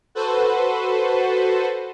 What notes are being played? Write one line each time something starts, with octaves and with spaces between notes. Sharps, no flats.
F#4 A4 B4 C5